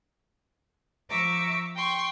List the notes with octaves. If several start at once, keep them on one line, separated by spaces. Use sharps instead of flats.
F3 E5 A#5 C#6 D6 E6
G5 C6 C#6